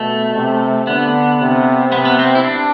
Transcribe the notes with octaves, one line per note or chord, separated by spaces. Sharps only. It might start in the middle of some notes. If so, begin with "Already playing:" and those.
Already playing: B2 A3
C3
D3 B3
C3
C3 B3
B3
C4
E4
D4